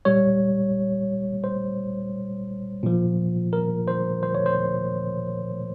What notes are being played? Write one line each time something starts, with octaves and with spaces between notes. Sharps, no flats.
A#2 G3 C#5
C5
A#2 F3
A#4
C5
C5
C#5
C5